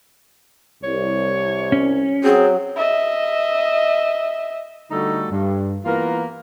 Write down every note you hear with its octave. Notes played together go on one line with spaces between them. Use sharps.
C2 C#5
C#4
F#3 C4 G#4
D#5 E5
D3 G3 A3 D#4 F#4 A4
G2
E3 A#3 B3 F4 A#4